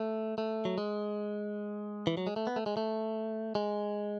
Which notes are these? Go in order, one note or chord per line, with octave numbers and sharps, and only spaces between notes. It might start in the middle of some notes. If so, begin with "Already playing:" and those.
Already playing: A3
A3
F#3
G#3
E3
F#3
G#3
A3
B3
A3
G#3
A3
G#3